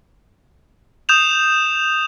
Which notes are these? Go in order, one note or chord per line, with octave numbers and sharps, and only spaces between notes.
D#6 G6 E7 F7